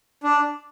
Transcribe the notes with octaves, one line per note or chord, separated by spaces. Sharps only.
D4